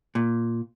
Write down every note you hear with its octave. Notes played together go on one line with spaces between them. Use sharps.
A#2